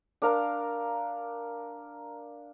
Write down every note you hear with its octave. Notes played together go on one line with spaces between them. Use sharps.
D4 A#4 F5 A#5